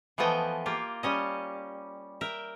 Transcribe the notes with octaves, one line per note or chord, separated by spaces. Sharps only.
E3 F3 A3 B3 D#5 G5
A#3 F4 G4
G3 C#4 D#5
A#4 E5 G5